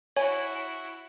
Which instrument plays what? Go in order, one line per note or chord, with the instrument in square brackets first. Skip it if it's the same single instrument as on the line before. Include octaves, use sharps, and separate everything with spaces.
[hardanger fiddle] E4 F#4 [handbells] C#5 G#5